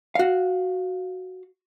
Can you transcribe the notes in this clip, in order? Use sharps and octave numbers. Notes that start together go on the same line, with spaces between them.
F#4 F5